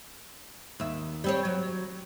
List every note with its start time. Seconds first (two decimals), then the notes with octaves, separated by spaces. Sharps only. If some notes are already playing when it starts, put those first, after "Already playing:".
0.80 D#2 E5
1.24 G3 C4 C#5
1.45 F#3